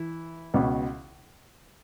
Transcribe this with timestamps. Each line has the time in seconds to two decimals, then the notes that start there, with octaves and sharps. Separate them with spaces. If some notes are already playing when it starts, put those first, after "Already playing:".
Already playing: E3 E4
0.54 C#2 B2